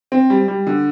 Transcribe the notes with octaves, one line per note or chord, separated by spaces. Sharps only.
C4
G3
G3
D3